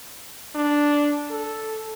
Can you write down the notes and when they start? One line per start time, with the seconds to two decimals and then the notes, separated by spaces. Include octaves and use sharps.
0.55 D4
1.30 A4